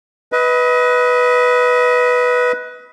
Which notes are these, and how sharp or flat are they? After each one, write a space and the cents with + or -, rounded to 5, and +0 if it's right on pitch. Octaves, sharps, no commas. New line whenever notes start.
B4 +0 D#5 +30